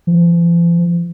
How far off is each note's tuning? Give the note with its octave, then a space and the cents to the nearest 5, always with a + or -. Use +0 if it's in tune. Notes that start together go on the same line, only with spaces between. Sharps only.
F3 -45